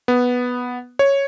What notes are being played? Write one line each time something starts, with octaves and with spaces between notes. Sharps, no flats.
B3
C#5